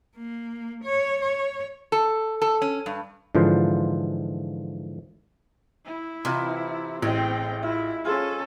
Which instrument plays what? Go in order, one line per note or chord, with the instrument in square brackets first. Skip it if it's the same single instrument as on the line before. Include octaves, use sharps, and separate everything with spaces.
[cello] A#3
C#5
C#5
[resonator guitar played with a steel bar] A4
A4
C#4
G2
[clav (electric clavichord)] G#2 D3 E3 F3 F4 C5
[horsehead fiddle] E4
[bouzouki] C3 E3 [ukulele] F4 D#5
[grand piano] A1 [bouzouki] G#3 [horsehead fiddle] C4 G5
[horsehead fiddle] E4 [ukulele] F4 E5
[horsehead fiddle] C#4 A4 [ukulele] F4 G#4 C5